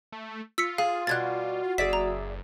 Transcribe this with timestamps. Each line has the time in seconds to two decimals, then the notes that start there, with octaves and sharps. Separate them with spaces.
0.12 A3
0.58 F4 E6 B6 C#7
0.78 G#4 F5
1.07 B2 F#3 G3 F#4 F#6 G#6 A6
1.78 F#1 G#4 D5 E5 B6
1.93 A#5